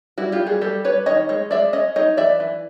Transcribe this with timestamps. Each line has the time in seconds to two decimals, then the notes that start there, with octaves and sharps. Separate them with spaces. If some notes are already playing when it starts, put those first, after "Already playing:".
0.18 G3 E4 F#4
0.32 F4 G4
0.40 G3
0.47 F#4 G#4
0.61 G3 G4 A4
0.84 G3 B4 C#5
1.06 D#3 C#5 D#5
1.29 G#3 C#5 D#5
1.51 G#3 D5 E5
1.73 C#4 C#5 D#5
1.96 D#4 C#5 D#5
2.17 E3 D5 E5
2.40 E3